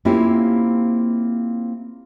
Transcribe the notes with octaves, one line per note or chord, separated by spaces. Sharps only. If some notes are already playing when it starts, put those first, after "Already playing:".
A#3 C4 C#4 E4 F4 G4